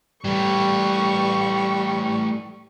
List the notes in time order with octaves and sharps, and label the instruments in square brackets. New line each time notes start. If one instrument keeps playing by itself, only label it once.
[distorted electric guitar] E3 A3 [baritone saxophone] G3 [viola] C#6